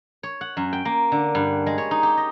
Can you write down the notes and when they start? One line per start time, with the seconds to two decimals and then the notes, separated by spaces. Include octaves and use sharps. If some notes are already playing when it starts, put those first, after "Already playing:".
0.23 C#5
0.41 F#5
0.57 F#2
0.73 G5
0.85 A#3
1.12 D3
1.35 G2
1.66 G#3
1.78 C#5
1.91 D#4
2.03 G4
2.17 D#5